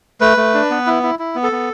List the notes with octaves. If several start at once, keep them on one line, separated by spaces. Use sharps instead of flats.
A3 B4
A3
D4
B3
E4
E4
E4
B3
A4
B3